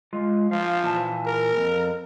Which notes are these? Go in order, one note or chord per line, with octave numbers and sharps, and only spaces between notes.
G#3 F4
F3 F5
A#2 E3 A5
A#4
F2